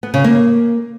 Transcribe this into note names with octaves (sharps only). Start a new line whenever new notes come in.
B3
C#3
A#3